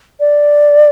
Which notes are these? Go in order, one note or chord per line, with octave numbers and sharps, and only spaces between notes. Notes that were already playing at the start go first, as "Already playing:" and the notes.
D5